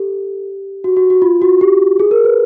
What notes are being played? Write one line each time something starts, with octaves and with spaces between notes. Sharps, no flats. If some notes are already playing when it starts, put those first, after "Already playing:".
Already playing: G4 A4
F#4
F#4
F#4
F4
F#4
G4
G#4
A#4
B4